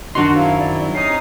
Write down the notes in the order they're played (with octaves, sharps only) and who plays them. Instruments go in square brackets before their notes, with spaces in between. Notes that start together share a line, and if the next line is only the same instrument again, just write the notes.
[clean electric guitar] F#2 D#3 D#4 [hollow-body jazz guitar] D4 C6 [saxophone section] F#4
[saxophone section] F#3 C4 E4 [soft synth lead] F5
[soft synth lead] D5
[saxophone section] C3 C#4 D#4 [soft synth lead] C7